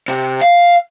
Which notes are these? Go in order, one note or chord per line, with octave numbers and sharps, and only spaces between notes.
C3
F5